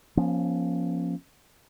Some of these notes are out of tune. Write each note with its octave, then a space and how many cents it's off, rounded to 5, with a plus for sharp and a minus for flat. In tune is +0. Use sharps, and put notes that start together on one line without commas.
F3 +0 A#3 +45 C#4 -5